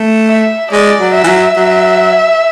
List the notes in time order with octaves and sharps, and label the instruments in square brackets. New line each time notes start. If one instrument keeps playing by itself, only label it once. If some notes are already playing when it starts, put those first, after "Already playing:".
Already playing: [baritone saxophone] A3
[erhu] E5
[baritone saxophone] G#3 [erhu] D5
[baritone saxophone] F#3
[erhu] E5
[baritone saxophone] E3
F#3
F#3